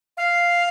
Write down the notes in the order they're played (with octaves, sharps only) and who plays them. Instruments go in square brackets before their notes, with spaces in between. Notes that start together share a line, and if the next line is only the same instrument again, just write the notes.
[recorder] F5